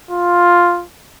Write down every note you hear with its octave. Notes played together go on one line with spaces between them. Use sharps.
F4